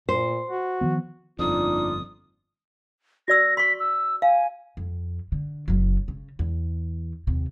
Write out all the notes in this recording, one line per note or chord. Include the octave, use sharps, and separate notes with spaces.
A#2 C5
F#4
D#3 F3 B3
G1 F2 A#3 D4 D#4 F4 D#6
F#4 D5 E6 A#6
C6 C#6 B6
E6
F5 G#5
F2
D3
F#1 F#3
C#3
E2
D#2 C3